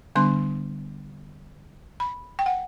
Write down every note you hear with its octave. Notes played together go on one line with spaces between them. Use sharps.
D3 G3 B3 D4 C6
B5
G5
F#5